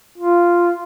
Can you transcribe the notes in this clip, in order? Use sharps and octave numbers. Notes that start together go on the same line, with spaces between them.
F4